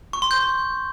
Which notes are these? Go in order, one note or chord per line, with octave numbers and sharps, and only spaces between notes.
C#6
C6
G6